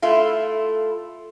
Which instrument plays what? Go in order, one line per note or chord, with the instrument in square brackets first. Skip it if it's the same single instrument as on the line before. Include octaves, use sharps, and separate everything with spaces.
[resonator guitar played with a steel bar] A3 E4 F4